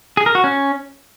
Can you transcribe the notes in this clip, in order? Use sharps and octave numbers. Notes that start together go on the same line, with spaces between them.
G#4
A#4
F#4
C#4